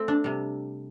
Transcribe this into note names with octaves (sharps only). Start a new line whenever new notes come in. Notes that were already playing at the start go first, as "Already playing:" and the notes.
Already playing: A3 C4
D4
C3 G3